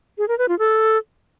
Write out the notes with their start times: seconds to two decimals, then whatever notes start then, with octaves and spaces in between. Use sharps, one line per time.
0.18 G#4
0.28 A#4
0.38 B4
0.49 F4
0.59 A4